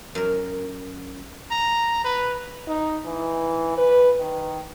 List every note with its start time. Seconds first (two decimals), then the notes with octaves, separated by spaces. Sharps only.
0.15 F#2 A#4
1.51 A#5
2.04 B4
2.68 D#4
3.06 E3
3.78 B4
4.20 D#3